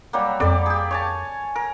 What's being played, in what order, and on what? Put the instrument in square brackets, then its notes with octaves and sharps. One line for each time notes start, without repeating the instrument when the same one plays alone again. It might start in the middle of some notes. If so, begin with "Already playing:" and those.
[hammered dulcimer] F#3 G3 A#3
[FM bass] F2 [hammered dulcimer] G3 D5
[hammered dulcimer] G4 G#4
C#5 G#5 A5
A#4